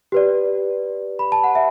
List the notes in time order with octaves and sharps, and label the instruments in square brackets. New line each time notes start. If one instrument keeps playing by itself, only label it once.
[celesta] G4 B4 D5
B5
A5
F#5
E5